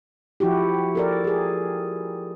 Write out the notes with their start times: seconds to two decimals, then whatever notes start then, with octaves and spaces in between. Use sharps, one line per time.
0.40 F3 E4 F#4 G4
0.95 A4 A#4 D5
1.24 G4 G#4